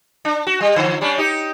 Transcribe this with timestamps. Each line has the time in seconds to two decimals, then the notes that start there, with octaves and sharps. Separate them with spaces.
0.25 D4
0.47 F#4
0.61 G3
0.76 D3 F3
1.01 G3 C#4 D4
1.18 D#4 G4